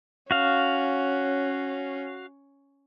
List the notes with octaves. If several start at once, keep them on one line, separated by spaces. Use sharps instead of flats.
C#4 F#4 F5